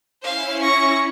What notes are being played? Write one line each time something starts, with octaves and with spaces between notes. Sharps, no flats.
C#4 E4 C5 F5
C#6 A#6